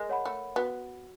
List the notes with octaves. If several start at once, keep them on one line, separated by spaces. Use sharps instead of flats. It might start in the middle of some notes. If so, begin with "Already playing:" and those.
Already playing: G#3 A#4
C#5 F#5 B5
A3
B3 F#4